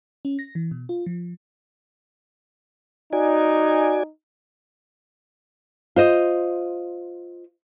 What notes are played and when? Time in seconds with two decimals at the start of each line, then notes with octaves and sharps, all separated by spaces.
0.25 C#4
0.39 A#6
0.55 E3
0.71 B2
0.89 F4
1.06 F3
3.13 D#4 F#4 D5 G#5
5.96 F4 C5 D#5